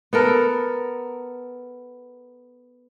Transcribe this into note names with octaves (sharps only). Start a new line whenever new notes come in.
B3 A4 A#4